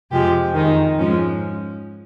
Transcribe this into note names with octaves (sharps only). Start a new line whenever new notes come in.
F2 C3 F3 G#3 G4
F2 D#3 G#3 D#4
G#2 F3 G#3 C#4